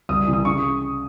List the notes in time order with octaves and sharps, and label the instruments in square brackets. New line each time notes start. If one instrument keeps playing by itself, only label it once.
[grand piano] C2 [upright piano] D#6
[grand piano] C3 E3
[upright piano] D#6
[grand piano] C#3 [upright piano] C#6